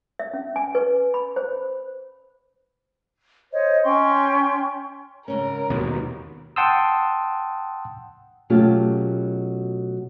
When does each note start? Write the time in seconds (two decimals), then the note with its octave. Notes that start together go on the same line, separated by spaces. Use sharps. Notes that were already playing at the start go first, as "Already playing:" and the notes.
0.19 E5
0.34 C#4
0.56 G#5
0.75 B4
1.14 B5
1.36 C5
3.52 C5 C#5 D#5
3.84 C#4 G5 C6 C#6
5.28 G#2 C#3 C#4 A#4
5.70 D#2 B2 B3
6.56 F#5 G5 A5 C6 D#6 E6
8.50 B2 F#3 A3 C#4 F4 G4